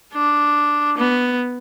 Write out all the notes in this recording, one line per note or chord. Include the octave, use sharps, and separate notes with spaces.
D4
B3